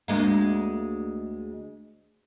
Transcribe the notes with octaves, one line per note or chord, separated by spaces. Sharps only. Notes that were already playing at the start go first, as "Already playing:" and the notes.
D2 G#3 A#3